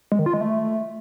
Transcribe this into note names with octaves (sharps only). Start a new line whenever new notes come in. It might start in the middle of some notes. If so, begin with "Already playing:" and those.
G#3
D#3
F4
G#3
A3